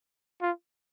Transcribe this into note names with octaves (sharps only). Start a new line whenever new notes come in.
F4